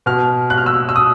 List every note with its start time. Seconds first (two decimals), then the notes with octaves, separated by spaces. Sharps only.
0.06 B2 F6
0.50 F#6
0.58 F6
0.66 E6
0.89 E6
0.96 D#6